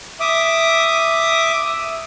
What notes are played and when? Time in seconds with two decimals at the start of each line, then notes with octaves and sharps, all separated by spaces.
0.20 E5 D6 D#6